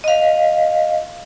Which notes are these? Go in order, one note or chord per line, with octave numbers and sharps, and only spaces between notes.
D#5 F5